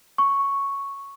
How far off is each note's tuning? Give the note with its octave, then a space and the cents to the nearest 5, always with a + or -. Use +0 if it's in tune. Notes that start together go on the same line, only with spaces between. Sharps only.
C#6 +0